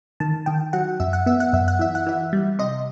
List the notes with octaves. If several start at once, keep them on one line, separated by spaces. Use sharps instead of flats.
D#3 A5
D#3 G5
F#3 F#5
F#2 E5
F#5
B3 E5
F#5
F#2 E5
F#5
E3 E5
F#5
E3 E5
G3
C3 D#5